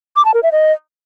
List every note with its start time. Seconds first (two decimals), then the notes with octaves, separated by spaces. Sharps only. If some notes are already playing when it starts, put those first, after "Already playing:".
0.16 D6
0.25 A5
0.34 A#4
0.43 E5
0.52 D#5